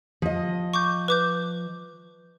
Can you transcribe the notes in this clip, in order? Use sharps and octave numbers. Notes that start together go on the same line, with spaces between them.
F3 D#5
C#6 D6 G6
B4 D6 G6